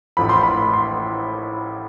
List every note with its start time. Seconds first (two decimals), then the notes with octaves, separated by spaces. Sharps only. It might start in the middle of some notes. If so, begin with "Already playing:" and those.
0.17 A1 A2 F3 B5
0.29 C6
0.43 B5
0.73 C6